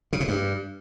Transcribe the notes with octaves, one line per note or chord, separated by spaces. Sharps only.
C#3
C3
G2